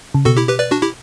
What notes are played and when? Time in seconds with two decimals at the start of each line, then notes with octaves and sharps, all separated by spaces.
0.14 C#3
0.25 B2 F#4 A4
0.37 E4 G4
0.49 G4 B4
0.59 B4 D5
0.71 D4 F#4
0.82 E4 G4